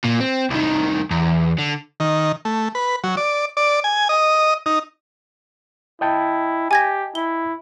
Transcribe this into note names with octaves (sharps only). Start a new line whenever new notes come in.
A#2
C4
C2 D#3
E2
D3
D#3
A3
B4
F#3
D5
D5
G#5
D#5
D#4
E4 D#5 G5 A5
G4 G#5 G#6 A#6
E4 G7